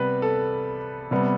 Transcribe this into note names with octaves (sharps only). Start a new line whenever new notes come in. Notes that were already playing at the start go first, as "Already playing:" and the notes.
Already playing: C3 G3 B3 B4
A4
C3 G3 B3